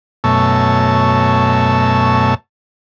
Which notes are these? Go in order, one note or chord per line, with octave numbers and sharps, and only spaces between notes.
F#2 B2 A3 C#5 A5 E6